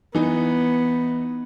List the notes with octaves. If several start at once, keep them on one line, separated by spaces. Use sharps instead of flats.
E3 B3 D#4